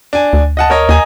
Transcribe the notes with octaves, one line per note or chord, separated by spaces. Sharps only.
D4 G#5
D2
D#5 F#5 A5
A#4 C#5 D#5
D#2 D#5 G#5 A#5